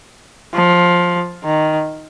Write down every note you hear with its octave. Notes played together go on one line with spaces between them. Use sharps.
F3
D#3